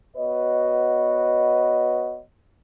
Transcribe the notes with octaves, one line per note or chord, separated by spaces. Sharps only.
B3 F#4 B4 C#5 D#5